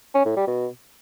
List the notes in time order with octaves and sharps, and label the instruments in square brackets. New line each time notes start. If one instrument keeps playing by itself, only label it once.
[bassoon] C#4
A2
G3
B2